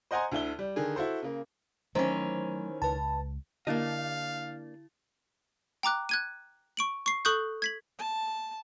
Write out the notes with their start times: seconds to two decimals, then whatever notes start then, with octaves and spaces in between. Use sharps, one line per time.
0.11 C5 D#5 F#5 G#5 A#5 C6
0.32 D2 D3 E4 G7
0.59 G3
0.76 D3 D#3 D#4 G#4
0.96 E4 F#4 A4 C5
1.22 C#3 A#3
1.95 D#3 E3 F#3 A3 C#4 C5
2.82 C#2 B4 A5
3.67 D3 A#3 D4 E4 D#5 F5 A6
5.83 G5 A#5 D6 F#6
6.09 F#6 G#6 D#7
6.77 C#6 D7 F#7
7.06 C#6 C7
7.25 A4 C#6 D#6 F#6 G6
7.62 G#6 B6 F#7
7.99 A5